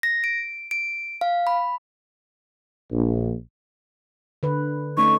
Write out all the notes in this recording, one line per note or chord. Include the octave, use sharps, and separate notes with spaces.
A#6
D7
D7
F5
B5
A#1
D3 B4
A3 C#4 D#4 C#6